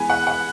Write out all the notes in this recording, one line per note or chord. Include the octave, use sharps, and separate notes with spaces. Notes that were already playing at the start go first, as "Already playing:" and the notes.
Already playing: E3 G#3 B3 G#5 B5
F#5
F#5